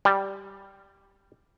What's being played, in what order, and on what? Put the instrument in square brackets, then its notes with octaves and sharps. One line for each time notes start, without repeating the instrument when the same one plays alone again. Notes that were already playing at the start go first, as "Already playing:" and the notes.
[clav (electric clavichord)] G3